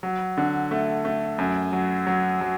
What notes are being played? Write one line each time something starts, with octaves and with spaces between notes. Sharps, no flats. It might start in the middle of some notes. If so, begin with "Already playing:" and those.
F#3
D3
A3
A3
F#2
F#3
F#3
F#3